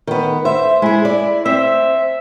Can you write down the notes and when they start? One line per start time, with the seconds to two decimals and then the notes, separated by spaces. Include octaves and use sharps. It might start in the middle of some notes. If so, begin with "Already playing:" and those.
0.07 D#3 B3
0.45 C5 E5
0.82 G#3 E4 G#4
1.05 D5
1.46 C4 E5